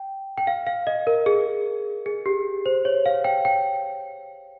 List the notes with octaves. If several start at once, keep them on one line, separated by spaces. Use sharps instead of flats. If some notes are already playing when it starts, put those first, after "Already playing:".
Already playing: G5
G5
F5
F5
D#5
A#4
G#4
G#4
G4
C5
C#5
F5
G5
G5